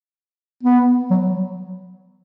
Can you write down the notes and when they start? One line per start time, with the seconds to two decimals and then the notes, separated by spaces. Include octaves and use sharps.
0.63 B3
1.10 F#3